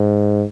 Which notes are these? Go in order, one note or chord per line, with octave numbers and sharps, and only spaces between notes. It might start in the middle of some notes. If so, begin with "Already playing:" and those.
Already playing: G#2